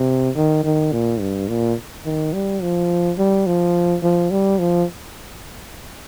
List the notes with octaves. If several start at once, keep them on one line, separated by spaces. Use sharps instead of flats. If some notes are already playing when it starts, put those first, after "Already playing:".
Already playing: C3
D#3
D#3
A#2
G2
A#2
D#3
G3
F3
G3
F3
F3
G3
F3